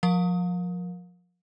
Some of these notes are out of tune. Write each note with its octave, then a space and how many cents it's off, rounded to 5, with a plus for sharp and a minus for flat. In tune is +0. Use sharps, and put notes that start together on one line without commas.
F3 +30 A#4 +15 F5 +35